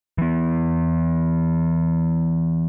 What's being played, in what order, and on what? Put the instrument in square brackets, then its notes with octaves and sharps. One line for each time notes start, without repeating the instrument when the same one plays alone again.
[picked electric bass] E3 B3